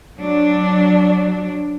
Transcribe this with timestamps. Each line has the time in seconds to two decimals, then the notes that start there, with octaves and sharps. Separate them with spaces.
0.17 F#3 D4